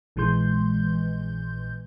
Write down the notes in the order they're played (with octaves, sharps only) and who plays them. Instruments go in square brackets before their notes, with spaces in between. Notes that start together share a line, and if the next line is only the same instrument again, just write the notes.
[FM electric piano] A#1 A#2 E3 G#3 C6 G6